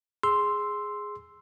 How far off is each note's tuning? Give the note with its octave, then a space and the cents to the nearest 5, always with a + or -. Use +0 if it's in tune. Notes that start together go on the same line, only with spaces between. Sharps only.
G#4 +0 C6 +0 E6 +0